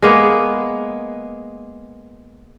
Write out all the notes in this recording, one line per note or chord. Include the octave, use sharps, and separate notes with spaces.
G#3 A#3 B3